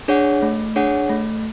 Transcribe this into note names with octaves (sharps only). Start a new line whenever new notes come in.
D4 G#4 C#5 F#5
A3
D4 G#4 C#5 F#5
A3